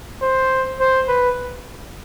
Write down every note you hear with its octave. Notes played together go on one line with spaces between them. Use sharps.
C5
C5
B4